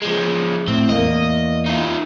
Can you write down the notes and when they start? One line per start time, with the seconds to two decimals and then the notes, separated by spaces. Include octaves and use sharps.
0.02 F3 G#3
0.68 A2 C4
0.89 E2 A#3 D#5
1.66 D#4 F4